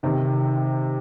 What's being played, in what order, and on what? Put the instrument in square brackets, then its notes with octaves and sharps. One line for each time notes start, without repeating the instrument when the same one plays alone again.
[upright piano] C3 D#3